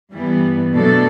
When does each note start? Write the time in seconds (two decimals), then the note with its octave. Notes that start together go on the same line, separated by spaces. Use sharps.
0.12 G2 E3 G3 B3
0.73 B2 F#3 A3 D4 A4